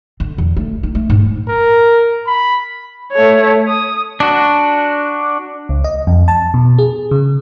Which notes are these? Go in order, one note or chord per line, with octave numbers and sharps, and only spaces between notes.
D3
E2
A3
D#4
A3
G#2
A#4
B5
A3 C#5
D#6
D4 F#4
C#2
D#5
F2
A5
B2
G#4
C#3